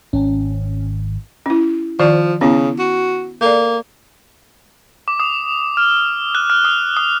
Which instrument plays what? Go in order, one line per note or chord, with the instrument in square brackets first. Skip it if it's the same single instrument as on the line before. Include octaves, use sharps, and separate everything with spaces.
[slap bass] G#1 [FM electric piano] C#4
[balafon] C#4 E4
[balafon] D#3 D5 [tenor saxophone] F3
[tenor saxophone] C#3 [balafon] B3 C#4 E4
[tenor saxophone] F#4
[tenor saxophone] A#3 [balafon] A4 D5
[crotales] D6
D#6
F6
F#6
F6
D#6
D#6